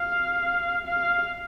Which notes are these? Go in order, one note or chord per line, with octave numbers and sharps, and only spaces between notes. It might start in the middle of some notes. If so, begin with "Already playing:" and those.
Already playing: F5
F5